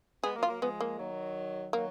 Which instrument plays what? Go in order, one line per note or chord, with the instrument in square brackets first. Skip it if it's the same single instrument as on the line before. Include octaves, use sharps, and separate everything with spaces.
[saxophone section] G#3 B3 [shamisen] G#4
[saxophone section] F#3 A#3
[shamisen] F4
[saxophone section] F#3 A#3
[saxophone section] F3 G#3 [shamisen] B3
[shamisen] A#3
[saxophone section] D#3 F#3
[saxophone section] D#3 F#3 [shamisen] A#3